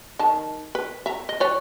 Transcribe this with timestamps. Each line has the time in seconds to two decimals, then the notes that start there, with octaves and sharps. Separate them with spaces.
0.19 D#3 A5
0.75 B4
1.06 E5 A#5
1.29 D#5
1.40 B4 C#5 D5